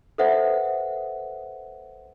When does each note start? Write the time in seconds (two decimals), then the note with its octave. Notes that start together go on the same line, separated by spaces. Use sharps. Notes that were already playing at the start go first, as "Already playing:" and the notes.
0.18 A4 B4 C5 E5 F#5